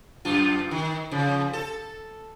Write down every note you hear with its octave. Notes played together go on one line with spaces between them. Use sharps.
F#2 F4
D#3
C#3 F3
A4